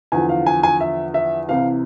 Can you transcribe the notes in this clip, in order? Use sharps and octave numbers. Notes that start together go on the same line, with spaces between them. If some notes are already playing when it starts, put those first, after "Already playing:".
E2 D3 F3 G#5
F5
G#5
G#5
E5
E5
C2 C3 E3 F5